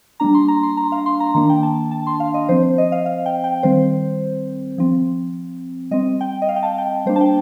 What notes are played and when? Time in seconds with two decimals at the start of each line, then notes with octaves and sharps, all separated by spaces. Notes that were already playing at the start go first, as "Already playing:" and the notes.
0.20 G3 A#3 D4 A#5
0.35 C6
0.48 A#5
0.63 C6
0.77 A#5
0.92 F5
1.06 C6
1.20 A#5
1.35 D#3 A#3 D4 A#5
1.49 G5
1.63 A5
1.91 A5
2.07 C6
2.20 F5
2.34 D#5
2.49 F3 C4 C5
2.63 C5
2.78 D#5
2.92 F5
3.06 F5
3.26 G5
3.44 G5
3.63 D#3 G3 C4 C5
4.78 F3 C4
5.91 G3 C4 D#5
6.21 G5
6.42 D#5
6.49 F5
6.56 G5
6.63 A5
6.78 G5
7.06 G3 A#3 D4 C5
7.16 A5
7.21 G5